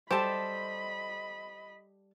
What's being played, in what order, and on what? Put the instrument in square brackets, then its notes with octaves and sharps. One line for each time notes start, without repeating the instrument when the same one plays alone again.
[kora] G3 [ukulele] G4 A4 A5 [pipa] C5 [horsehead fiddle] D#5 B5